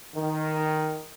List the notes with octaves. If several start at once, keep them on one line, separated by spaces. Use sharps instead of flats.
D#3